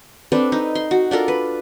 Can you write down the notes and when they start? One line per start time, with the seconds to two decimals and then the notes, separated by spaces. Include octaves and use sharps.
0.32 C4 D4 A4 B4
0.52 D#4
0.75 C6
0.91 F#4
1.11 D4 F4 A4 A#4
1.28 B4